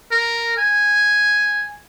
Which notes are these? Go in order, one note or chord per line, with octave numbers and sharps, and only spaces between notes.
A#4
G#5